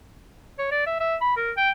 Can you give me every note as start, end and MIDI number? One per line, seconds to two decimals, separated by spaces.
0.59 0.67 73
0.71 0.86 74
0.86 0.99 76
1.00 1.16 76
1.21 1.35 83
1.37 1.51 70
1.57 1.71 79